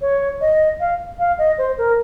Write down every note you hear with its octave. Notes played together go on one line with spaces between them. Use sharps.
C#5
D#5
F5
F5
D#5
C5
A#4